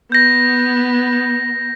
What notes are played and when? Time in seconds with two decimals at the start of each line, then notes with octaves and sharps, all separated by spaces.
0.12 B3 G6 A#6